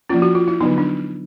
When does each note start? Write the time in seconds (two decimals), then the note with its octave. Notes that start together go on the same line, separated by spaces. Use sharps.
0.09 F3 A#3 C#4 F4
0.22 F#4
0.35 F4
0.48 E4
0.60 D3 F#3 B3 D#4
0.78 D4